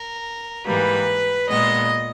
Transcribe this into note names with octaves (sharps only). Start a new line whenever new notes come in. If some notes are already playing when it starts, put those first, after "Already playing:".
Already playing: A#4
G#2 E3 G3 A#3 B4
A#2 G#3 B3 D#5